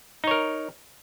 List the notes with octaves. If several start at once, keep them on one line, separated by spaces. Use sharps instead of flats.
D#4 A#4 C#5